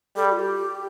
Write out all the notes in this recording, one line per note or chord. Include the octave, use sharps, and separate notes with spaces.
G3 A4
G4
F4
G4